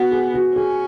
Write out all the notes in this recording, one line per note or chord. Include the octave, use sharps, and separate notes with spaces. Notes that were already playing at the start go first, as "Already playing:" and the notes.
Already playing: B3 F#4
G#4
F#4
C#4 G#4